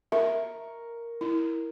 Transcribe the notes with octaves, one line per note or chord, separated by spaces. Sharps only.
A#4 E5 C#6
E4